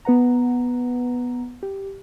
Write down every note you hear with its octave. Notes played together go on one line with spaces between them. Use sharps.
B3 B4 F#5 A#5
G4